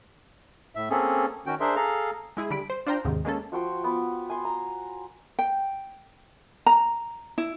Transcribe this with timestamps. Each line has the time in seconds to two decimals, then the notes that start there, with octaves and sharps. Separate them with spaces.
0.75 A2 E5
0.90 A#3 C4 C#4 G#4 A4
1.46 D#3 C#4 F#4 G5
1.60 D4 G#4 A#4 C5 E5 C6
1.76 G#4 A4 F5 A#5
2.37 G#3 E4 G#4
2.50 D3 G3 B5 D7
2.70 C5
2.87 D4 F4 C5 G5 A#5
3.05 D#2 G#2 C3 D#3
3.25 G#3 A#3 C#4 A4
3.52 F3 F#4 G5 C6
3.84 B3
4.30 G#5 C6
4.45 A#5
5.39 G5
6.66 A#5
7.38 E4